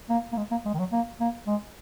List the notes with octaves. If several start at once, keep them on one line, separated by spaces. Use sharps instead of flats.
A#3
A#3
G#3
A#3
G#3
D#3
F#3
A#3
A#3
G#3